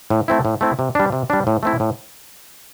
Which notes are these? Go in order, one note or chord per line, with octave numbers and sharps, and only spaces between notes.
A2
A3 C4 E4
A2
A3 C4 E4
C3
G3 D4
C3
G3 D4
A2
A3 C4 E4
A2